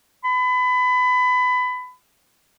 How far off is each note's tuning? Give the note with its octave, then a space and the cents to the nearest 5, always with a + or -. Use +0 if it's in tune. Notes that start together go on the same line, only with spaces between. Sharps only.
B5 +25